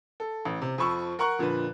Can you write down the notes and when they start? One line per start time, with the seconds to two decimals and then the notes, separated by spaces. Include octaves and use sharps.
0.20 A4
0.45 A1
0.62 C3
0.78 F2 F3 B5 C#6 E6
1.19 A#4 F#5 A#5 C#6 F#6
1.39 F2 A#2 D3 B4